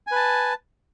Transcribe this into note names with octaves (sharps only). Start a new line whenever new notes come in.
B4 G#5 A5